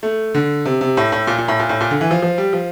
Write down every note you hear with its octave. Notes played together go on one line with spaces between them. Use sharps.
A3
D3
C3
C3
A2
A2
A#2
A#2
A2
A#2
A2
A#2
D3
E3
F3
F3
G3
F3